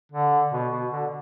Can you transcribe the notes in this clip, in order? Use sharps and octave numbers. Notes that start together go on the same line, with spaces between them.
D3
B2
B2
D3